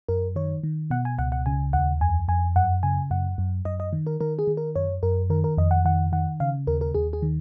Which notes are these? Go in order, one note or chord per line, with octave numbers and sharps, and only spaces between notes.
F#2 A#4
D#3 C#5
D#3
B2 F#5
G#5
C#2 F#5
F#5
C#3 G#5
D#2 F#5
F2 G#5
F2 G#5
F#2 F#5
C#3 G#5
F#2 F#5
F#2
F#2 D#5
D#5
D#3
A#4
D#3 A#4
G#4
D#3
A#4
F#2 C#5
F#2 A#4
D#3 A#4
A#4
F2 D#5
F#5
D#3 F#5
D#3 F#5
C#3 F5
D#2 A#4
A#4
D#2 G#4
G#4
D#3